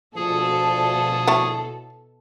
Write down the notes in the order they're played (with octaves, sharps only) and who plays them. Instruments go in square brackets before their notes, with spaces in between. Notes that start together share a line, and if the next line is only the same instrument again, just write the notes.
[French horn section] D2 F3 [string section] B2 A4 [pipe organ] G#4
[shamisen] E4 C#5 A5